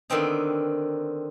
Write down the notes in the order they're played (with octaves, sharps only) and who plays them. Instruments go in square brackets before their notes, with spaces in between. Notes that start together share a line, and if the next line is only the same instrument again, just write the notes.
[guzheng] D3 D#3 B3 C4 D#4